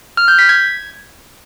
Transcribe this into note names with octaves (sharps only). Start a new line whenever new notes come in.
F6
G6
B6
G#6